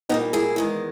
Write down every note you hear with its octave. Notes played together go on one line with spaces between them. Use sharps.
A#2 G3 A#3 B3 D#4
E4 G#4
E2 D#3 G#3